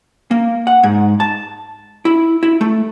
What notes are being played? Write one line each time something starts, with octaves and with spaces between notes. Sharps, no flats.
A#3
F#5
G#2
A5
E4
E4
A3